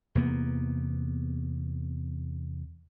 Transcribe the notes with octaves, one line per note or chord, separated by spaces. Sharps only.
E2 C3 A#3 B3